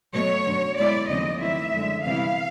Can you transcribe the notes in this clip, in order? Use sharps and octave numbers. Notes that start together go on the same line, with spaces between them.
B2 F#3 A3 C#5
F#2 D3 F#3
B2 G#3 B3 E4 D5
D#2 C#3 F3 A3 C4 D#5
D#3 F#3 A3 C4 E4 E5
F#2 D3 F3 G#3
C3 E3 G3 B3 E4 F5